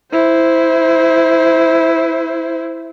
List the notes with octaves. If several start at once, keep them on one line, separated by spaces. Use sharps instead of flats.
E4 C5